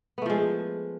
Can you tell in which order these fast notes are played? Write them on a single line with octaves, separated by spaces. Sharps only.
B3 A3 F3 G#3